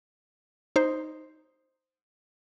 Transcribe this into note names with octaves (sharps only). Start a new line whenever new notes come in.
D#4 C5